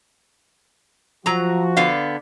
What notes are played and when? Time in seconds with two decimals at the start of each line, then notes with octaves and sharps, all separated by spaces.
1.26 F3 F#3 F#4 A#5
1.77 D3 B3 F5